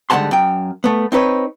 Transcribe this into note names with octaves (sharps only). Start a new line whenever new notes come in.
G#2 D3 G3 F#5 A5 C6
F#2 G5
A3 B3
C4 D#4 B4 C#5